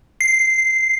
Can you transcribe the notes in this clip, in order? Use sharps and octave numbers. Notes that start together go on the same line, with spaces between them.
C7